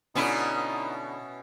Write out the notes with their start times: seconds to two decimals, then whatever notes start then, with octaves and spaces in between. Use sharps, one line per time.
0.16 B2 D3 B3 C#4 D#4 E4